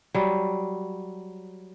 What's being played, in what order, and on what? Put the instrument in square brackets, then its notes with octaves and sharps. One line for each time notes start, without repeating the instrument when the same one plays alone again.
[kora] F#3 G3